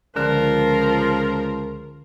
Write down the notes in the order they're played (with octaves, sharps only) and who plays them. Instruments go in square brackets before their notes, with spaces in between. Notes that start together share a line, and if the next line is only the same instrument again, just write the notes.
[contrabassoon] C#2 [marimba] D3 [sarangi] F3 [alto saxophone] A#4